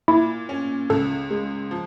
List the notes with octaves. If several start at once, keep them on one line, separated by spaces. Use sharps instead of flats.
A#2 E4
C#4
C#2 A4
G#3
F3